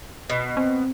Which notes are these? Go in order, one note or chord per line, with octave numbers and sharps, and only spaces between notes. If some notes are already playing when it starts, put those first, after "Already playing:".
B2
C4